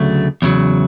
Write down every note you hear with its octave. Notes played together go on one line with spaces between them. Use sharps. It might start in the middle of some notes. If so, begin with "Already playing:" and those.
Already playing: D2 C#3 F#3 A3
E2 C#3 F#3